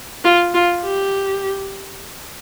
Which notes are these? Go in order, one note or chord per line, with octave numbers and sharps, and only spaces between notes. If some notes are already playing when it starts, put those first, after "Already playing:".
F4
F4
G4